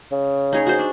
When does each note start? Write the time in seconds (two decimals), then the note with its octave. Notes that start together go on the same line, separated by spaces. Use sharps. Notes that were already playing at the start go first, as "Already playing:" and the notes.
0.12 C#3
0.53 D#4 G#4 C#5
0.67 F#4 C5
0.79 D4